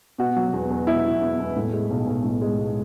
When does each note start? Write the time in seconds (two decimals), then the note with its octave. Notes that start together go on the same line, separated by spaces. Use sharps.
0.18 B2 F#4
0.36 F#3
0.53 E2
0.70 E2
0.87 B2 E4
1.05 F#3
1.21 E2
1.39 E2
1.56 A2
1.73 G#3
1.90 B1
2.07 B1
2.24 A2
2.42 G#3
2.59 B1